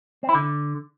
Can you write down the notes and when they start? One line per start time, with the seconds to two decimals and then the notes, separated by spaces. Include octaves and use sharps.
0.23 C4
0.29 E4
0.35 D3